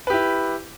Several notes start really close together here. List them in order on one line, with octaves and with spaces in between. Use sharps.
B4 G4 E4